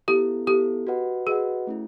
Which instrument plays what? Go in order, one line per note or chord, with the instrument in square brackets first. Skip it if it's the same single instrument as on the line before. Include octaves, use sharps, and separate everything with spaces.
[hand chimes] B3 E4 A4 [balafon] G4
[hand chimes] B3 E4 A4 [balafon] G4
[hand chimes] F#4 B4 D#5 F#5
[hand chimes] F#4 B4 D#5 F#5 [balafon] G#4
[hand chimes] A3 C#4 E4